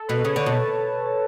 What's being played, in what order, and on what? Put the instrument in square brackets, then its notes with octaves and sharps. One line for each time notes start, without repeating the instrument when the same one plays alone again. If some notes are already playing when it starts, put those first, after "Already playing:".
Already playing: [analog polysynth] A4
[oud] B2 [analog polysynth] B4
[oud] C#3 [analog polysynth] C#5
[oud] D3 [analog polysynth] A5
[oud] B2